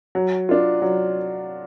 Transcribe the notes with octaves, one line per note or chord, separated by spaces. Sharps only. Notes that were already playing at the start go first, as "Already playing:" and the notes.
F#3
D4 F4
F#3